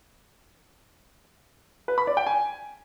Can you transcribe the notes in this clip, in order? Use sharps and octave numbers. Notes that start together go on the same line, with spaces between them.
B4
B5
D5
G5
G#5